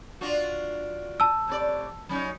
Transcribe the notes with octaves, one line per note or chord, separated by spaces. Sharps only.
D4 F4 F#4
A5 E6
A2 C3 D5
F#3 C#4 D#4